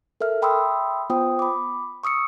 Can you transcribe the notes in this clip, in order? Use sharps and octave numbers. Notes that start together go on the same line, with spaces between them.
A4 A#4 E5 F6
E5 G5 B5 C6 D#6 E6
B3 F4 C5 G5 D#6
B5 D6
C#6 D#6 E6 C#7